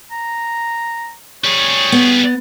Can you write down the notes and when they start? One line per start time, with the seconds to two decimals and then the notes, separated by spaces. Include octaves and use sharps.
0.11 A#5
1.44 G3 G#4 C#5
1.92 B3